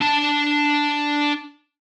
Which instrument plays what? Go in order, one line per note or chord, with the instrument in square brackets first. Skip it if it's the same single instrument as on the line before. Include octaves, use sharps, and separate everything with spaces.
[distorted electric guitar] D4 A5